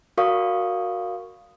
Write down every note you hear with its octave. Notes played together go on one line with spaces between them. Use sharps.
F#4 A#4 D5 F5 C#6 D#6